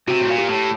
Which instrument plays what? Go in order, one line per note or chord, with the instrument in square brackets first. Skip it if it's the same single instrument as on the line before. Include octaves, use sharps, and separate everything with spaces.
[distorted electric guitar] C3 [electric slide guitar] F#4
[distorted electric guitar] A2
A#2
[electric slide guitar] G4
[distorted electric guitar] A2